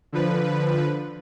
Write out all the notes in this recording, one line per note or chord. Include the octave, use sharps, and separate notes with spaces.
D3 F3 B4